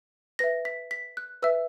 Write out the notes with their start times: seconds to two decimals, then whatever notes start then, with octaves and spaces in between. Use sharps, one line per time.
0.39 B4 E5 A#6
0.65 B6
0.91 B6
1.17 F#6
1.42 B4 E5 E6